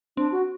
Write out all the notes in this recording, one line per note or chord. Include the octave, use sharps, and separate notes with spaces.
C4 D4
F#4